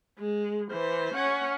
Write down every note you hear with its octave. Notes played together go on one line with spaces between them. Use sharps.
G#3
E3 C5
C#4 F#5